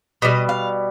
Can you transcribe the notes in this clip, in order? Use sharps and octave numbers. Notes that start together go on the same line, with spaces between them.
B2 G3 D#5
F5